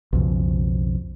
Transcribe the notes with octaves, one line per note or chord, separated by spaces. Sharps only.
B1 F2 C#3